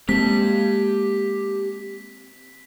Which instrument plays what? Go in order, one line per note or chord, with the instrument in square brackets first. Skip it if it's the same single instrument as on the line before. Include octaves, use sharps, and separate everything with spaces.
[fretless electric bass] G#3 A#3 [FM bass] C4 [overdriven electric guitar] G4 A5 [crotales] B6